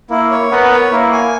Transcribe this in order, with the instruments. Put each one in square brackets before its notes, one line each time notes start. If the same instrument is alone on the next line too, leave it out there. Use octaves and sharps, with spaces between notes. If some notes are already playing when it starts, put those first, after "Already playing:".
[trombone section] A#3 [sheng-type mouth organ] E4
[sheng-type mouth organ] C#5
[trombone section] B3 [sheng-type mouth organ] A#4
[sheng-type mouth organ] C#5
[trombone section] A#3 [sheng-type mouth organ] E4
[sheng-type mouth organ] G#5